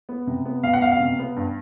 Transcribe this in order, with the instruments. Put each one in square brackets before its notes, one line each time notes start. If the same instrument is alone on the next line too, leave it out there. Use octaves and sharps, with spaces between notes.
[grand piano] B3
C3
B3
B2 F5
F#5
B2 F5
F5
C3
B3
G2